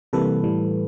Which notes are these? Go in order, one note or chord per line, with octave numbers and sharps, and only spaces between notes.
C3 E3 G3 A#3 A4 B4
A2 E3 G3